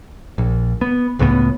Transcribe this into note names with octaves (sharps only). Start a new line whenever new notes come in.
A#1
B3
C#2 A2 A3 B3